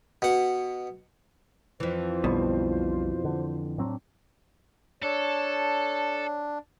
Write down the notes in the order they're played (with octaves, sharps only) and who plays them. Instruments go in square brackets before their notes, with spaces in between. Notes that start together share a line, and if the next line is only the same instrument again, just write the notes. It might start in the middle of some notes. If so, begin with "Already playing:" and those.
[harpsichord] B2 F#5
[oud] F2 E3 [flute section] F4 C5
[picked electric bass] B1 D3 G3 [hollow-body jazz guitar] B2
[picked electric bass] D3
[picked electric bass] A2 F#3 C4 [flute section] D4
[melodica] D4 [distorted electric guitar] A4 [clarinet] C#5